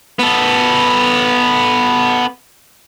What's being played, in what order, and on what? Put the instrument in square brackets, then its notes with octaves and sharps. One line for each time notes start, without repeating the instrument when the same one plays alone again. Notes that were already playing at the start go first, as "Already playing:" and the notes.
[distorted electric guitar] B3 A4